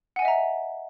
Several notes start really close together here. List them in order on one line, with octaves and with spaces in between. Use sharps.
F#5 G#5 D#5 E5 A#5